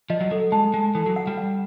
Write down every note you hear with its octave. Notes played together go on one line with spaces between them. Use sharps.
F3 D#5
F#3
F#3 A4
G#3 A5
G#3 A5
E3 A4
F#3
F#5
G3
F#5